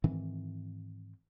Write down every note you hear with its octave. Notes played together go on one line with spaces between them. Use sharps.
G#2 D#3 E3 C4